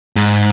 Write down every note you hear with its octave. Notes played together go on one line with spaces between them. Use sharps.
G#2